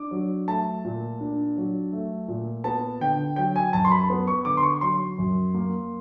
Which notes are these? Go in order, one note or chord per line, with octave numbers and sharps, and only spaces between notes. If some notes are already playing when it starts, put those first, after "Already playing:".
Already playing: D4 D6
F#3
A3 A5
A#2
D4
F#3
A3
A#2
B3 A5
D3 G5
F#3 G5
G#5
F#2 A5
C6
B5
B3
C#6
D3 D6
C6
C#6
F#3 C6
F#2
A#3